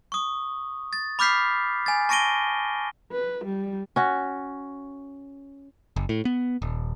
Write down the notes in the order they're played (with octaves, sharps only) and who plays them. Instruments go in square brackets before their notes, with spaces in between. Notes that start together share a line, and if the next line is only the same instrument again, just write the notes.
[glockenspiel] C#6 D#6
A6
B5 D6 F6 G6 B6 C7
G#5 A6
A5 C#6 A#6 D7 D#7 G7
[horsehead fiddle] B4
G3
[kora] C#4 F#4
[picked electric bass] F#1
A2
B3
D#1